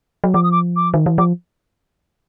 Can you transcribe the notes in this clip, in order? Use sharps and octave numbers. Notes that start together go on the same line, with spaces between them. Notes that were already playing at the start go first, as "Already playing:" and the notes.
F#3
F3 D6
D#6
D6
D6
D#3
E3
F3 D6